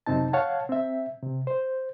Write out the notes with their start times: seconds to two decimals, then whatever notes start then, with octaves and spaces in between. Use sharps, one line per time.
0.07 F#2 C3 C4 D#4 A5
0.33 C#5 F5 F#5 A5
0.69 C4 E5
1.22 C3
1.47 C5